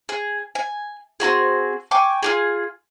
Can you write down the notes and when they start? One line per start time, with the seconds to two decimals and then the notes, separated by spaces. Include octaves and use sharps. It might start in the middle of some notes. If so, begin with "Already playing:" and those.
0.09 G#4
0.55 G#5
1.20 C4 E4 F#4 G#4
1.91 G5 G#5 C#6 D6
2.23 F4 G4 G#4